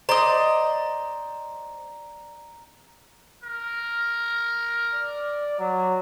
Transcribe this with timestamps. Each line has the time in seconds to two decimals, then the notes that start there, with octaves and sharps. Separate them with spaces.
0.09 C5 D5 D#5 A#5
3.44 A#4
4.94 D5
5.59 F#3